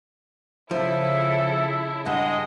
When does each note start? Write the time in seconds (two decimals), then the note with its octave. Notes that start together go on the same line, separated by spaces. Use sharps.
0.71 C#3 F3 E4 A4 E5
2.06 G2 G#3 D#5 F#5